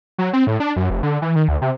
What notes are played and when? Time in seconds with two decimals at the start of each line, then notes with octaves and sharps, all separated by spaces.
0.18 F#3
0.33 C4
0.47 A2
0.60 D4
0.76 F#2
0.90 F1
1.03 D3
1.22 E3
1.36 D#3
1.48 D2
1.62 C3